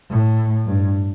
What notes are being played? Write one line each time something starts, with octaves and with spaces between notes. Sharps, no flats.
A2
G2